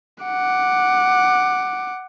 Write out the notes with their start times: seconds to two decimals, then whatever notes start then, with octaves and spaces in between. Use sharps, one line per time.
0.23 F#5 D6